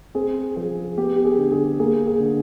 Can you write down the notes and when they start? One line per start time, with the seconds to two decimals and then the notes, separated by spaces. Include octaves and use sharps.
0.15 C4 G#4
0.56 F3 G#4
0.97 B3 G4
1.16 G4
1.25 G#4
1.38 D3
1.52 G#4
1.79 A#3 G#4
2.07 G#4
2.20 D3